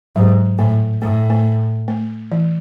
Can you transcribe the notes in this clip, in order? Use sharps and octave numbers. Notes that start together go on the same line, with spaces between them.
G#2 F#3
A2 A3
A2 A3
A3
A3
E3